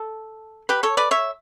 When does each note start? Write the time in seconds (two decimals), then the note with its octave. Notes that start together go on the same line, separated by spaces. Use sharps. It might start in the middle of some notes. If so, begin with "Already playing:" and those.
Already playing: A4
0.69 G4 B4
0.83 A4 C#5
0.97 B4 D5
1.11 C#5 E5